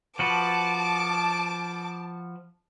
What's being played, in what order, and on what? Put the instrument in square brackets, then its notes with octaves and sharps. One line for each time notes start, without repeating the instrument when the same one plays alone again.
[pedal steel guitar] F3 F#4 B4 [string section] A5 [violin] D6